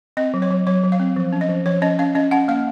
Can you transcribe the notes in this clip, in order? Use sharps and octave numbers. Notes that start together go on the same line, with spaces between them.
C4 D#5
F#3
C#5
F#3
F#3 C#5
F#3
F5
C4
F3
C#4
D#5
F3
F3 C#5
C#4 D#5
C#4 F5
C#4 D#5
C#4 F#5
A#3 F5